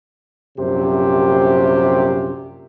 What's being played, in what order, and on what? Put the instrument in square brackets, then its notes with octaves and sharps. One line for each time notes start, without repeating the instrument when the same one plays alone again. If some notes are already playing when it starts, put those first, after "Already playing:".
[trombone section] A#1 F#2 C3 G4 C5